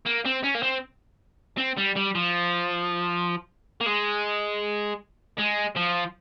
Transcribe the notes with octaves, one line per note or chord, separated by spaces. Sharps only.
A#3
C4
C#4
A#3
C4
C4
G3
G3
F3
A#3
G#3
G#3
F3